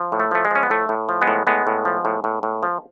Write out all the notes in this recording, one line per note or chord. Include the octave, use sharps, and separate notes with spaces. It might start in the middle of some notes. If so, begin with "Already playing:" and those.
Already playing: F3
A2
A3
F3 A3
G#3
F3 C#4
B3
A2 A3
A2
F3
G#3 B3
A2
A2 G#3 B3
A2
F3
A2
A2
A2
F3